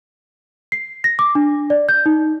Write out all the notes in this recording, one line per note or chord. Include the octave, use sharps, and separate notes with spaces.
C7
A#6
D6
D4
D5
G6
D#4